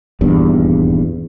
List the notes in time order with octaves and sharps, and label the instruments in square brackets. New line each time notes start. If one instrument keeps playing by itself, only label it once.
[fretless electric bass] D#1 E2 G2